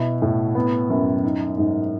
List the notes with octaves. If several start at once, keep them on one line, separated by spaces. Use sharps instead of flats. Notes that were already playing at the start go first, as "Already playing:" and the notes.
Already playing: B2 E4
A2
B3
F#2
D#4
G#2